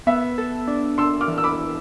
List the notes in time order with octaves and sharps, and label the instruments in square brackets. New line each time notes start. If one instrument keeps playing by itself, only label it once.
[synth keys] B3 [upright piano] E5
[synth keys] A4
D4
[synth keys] D4 [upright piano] C6 E6
[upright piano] D6 F6
[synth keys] E3
[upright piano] E6
B5 D6
[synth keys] E3